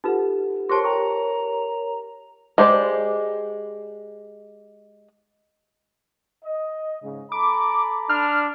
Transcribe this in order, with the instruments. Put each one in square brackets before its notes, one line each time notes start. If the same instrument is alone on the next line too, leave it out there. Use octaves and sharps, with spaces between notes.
[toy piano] D#4 F4 B4 [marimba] G4 A4 F#5
[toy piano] G4 C5 A5 [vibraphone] A#4 C#5 [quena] C6
[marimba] G5 [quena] A#5 [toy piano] C#6
[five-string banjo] G#3 G4 C5 D5
[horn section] D#5
G#2 C#3
[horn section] A4 A#5 B5 [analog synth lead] D6
[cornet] D4 [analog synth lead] F6